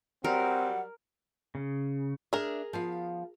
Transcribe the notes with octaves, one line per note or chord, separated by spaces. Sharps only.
F#3 G3 C4 A#4 F#5
C#3
D4 G#4 A#4 E5
F3 B3 F5